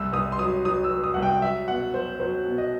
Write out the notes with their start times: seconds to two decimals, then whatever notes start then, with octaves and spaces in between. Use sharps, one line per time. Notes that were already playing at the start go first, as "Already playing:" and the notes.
Already playing: C2 E6
0.13 C2 D#6
0.32 C6
0.39 F#3 D#6
0.65 F#3 D#6
0.84 E6
0.90 F#3
1.04 D#6
1.14 C2 F#5
1.22 G5
1.42 F#3 E5
1.68 B2 F#5
1.94 F#3 C5
2.20 F#3 C5
2.45 B2
2.58 D#5